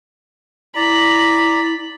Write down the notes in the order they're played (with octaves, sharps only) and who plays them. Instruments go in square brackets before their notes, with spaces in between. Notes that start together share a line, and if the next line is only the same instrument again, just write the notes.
[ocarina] E4 [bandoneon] D5 A#5 [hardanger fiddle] B5